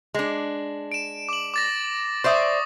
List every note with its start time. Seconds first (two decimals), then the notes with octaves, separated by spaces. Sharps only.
0.14 G#3 D4
0.92 D7 E7
1.29 D6 F#7
1.54 D6 A6 A#6
2.24 C5 D5 E5 C#6 D#6